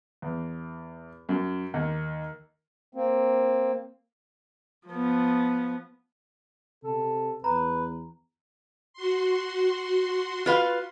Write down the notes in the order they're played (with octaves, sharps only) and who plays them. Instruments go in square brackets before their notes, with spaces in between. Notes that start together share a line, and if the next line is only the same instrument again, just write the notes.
[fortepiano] E2
F#2
D#2
[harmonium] A#3 C4
[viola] F3 B3
[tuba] C3 [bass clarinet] A4
[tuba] E2 [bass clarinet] B4 [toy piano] A#5
[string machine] F#4 C6
[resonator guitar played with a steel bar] F4 B4 F5